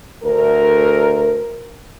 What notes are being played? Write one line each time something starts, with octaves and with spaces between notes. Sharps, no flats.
D2 A#4